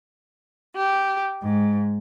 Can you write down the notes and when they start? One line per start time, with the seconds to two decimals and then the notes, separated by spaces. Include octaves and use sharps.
0.77 G4
1.41 G#2